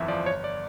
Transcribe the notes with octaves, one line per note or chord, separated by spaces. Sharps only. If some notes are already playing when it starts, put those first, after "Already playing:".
Already playing: G1 F2 E3 E5
F3 D5
G1 C#5
D5